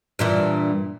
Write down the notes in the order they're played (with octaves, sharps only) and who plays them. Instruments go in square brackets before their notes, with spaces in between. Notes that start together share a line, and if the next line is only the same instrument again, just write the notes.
[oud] G2 A#2 E3